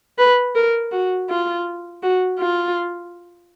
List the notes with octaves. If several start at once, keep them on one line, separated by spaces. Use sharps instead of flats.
B4
A#4
F#4
F4
F#4
F4